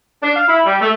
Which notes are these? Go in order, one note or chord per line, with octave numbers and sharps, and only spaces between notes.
D4
F5
E4
G3
A3